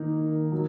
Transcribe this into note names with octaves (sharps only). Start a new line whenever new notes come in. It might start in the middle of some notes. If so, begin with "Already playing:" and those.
Already playing: D#3 A#3 D#4
F#3